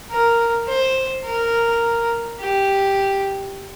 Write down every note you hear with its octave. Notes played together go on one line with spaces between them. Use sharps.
A#4
C5
A#4
G4